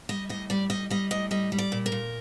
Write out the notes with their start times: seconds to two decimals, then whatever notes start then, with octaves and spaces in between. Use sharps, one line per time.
0.09 G3 D#5
0.29 A2 D#5
0.50 G3 D5
0.70 G3 D#5
0.90 G3 D#5
1.11 A2 D#5
1.31 G3 D#5
1.52 G3
1.58 D5
1.72 A#2
1.86 A#4
1.92 A#2